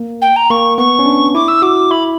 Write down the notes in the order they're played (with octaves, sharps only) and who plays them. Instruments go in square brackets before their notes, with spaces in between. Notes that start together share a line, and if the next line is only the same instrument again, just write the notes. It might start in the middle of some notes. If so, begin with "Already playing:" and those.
Already playing: [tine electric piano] A#3
[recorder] G5
A#5
[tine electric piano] A#3 [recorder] C#6
[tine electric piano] B3 [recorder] C#6
[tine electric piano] C#4
D4
[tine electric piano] E4 [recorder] D6
[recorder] E6
[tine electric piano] F#4 [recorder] D6
[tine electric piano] E4 [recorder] B5